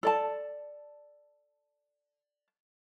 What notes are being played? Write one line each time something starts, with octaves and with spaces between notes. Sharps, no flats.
A4 D5 A5